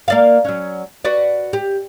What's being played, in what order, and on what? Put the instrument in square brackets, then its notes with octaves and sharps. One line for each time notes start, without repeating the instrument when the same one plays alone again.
[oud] A#3 D5 F5
F#3 C#4
F#4 B4 D5
G4